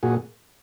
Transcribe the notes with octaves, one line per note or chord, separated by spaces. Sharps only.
A#2 F#4 G#4